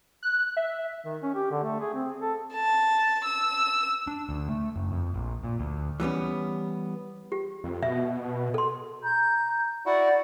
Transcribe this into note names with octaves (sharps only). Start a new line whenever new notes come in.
F#6
E5
D#3
C#4
G4
D3
A3
G#4
C4
A4
A5
E6
D4
D2
A3
F#1
F2
A#1
A#2
D2
E3 G3 B3 C#4
G4
F2
B2 E5
A4 C6
A#5 G6
E4 F#4 D5 F#5